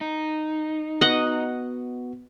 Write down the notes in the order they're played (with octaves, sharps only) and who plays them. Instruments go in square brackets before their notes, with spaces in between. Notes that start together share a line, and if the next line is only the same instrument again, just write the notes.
[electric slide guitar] D#4
[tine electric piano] B3 F#4 [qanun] D#5 F#5